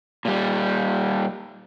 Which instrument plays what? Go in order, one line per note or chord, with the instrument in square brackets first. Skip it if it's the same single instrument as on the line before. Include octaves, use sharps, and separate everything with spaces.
[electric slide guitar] A#2 G3